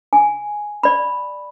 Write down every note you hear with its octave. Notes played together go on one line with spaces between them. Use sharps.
G#5
D5 B5